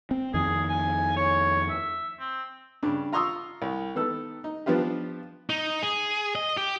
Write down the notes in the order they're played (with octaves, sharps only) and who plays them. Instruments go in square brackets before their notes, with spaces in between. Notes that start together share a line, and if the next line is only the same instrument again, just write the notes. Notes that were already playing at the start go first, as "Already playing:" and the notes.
[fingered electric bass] C4
[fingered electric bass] F2 D#3 [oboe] G#4
[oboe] G#5
C#5
E5
C4
[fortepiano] G2 C#3 D4
F4 A#5 C6 C#6 D#6 E6
C2
D#3 B3 A4 E6
D#4
F3 B3 D4 F4 G4
[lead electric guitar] D#4
G#4
D#5
G4